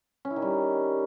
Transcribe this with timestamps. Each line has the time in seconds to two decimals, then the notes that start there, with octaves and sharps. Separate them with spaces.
0.25 C#4
0.30 E4
0.36 D#3
0.42 G3